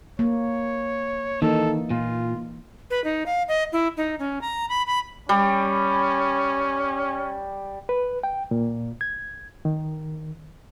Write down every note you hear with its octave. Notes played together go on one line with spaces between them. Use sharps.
A#3 C#5
D#3 E3 A#3 D#4 A4
A#2 F4
B4
D#4
F5
D#5
E4
D#4
C#4
A#5
B5
B5
G3 C#4
B4
G5
A#2
G#6
D#3